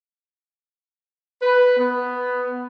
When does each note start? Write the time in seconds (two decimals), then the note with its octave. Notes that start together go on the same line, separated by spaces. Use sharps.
1.41 B4
1.77 B3